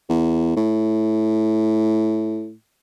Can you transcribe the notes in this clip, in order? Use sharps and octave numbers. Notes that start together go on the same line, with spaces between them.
E2
A2